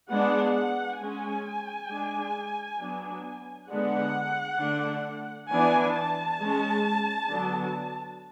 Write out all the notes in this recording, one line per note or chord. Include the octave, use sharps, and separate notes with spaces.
G#3 B3 D4 F#5
F#5
G#3 C#4 G#5
G#3 D4
F#3 B3 D4
D3 G#3 B3 D4 F#5
D3 A3 D4
E3 B3 D4 G#5
A5
G#3 C#4
D3 F#3 B3 D4